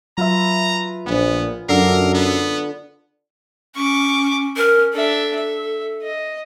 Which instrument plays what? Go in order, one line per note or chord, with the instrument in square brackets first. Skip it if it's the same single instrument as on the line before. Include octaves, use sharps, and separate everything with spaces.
[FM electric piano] F#3 E5 [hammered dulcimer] F4 B4 [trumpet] A#5
[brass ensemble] A#1 [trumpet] B3 [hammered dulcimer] G#5
[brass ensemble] F#2 [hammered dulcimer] D3 [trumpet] A#4 [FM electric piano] E6 C7
[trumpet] B3
[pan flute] C#4 [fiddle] C#6 D6
[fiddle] C#4 [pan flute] A#4
[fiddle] D4 E5 [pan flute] A4
[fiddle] E5
D#5